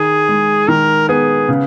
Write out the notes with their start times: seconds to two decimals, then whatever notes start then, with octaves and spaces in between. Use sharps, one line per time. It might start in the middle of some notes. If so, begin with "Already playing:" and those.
Already playing: D#3 G#4
0.28 G#3
0.68 D#3 A#4
1.09 B3 G#4
1.49 C#3